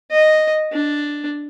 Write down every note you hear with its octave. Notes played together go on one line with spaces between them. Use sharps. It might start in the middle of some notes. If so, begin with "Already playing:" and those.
D#5
D4